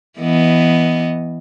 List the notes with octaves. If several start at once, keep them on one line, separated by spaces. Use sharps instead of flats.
E3 B3 D#5